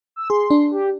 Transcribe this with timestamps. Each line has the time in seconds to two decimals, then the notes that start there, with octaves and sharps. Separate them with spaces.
0.16 E6
0.30 G#4 C6
0.50 D4
0.71 G4